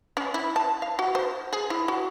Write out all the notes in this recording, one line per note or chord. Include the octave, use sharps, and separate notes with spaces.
C#4
E4
A5
F5
F#4
C5
G#4
E4
F#4